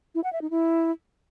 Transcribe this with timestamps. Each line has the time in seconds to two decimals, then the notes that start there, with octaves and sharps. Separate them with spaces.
0.15 E4
0.24 F#5
0.33 E5
0.42 D#4
0.50 E4